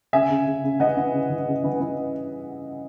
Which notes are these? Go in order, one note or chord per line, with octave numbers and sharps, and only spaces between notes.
C#3 E5 G#5
C#3
C#3
C#3
E3 D#5 F#5
E3
C#3
E3
C#3
E3
E3